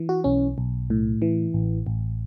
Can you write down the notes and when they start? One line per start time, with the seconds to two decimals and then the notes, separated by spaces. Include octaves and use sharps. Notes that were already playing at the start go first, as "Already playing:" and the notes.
Already playing: E3
0.09 F#4
0.24 B1 C#4
0.58 B1
0.90 A2
1.22 E3
1.54 A1
1.87 A1